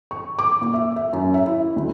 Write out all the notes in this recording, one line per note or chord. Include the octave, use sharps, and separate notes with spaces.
C#6
D6
A#2
E5
E5
F#2
E5
E4
D2